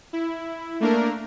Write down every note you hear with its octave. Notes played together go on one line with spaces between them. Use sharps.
E4
A3 A#3 D4 A#4